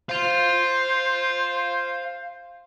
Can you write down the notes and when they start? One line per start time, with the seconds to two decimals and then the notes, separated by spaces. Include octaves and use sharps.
0.09 C5 F5 C6